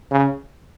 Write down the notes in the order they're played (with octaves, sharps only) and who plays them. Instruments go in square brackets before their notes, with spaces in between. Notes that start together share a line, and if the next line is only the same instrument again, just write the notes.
[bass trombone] C#3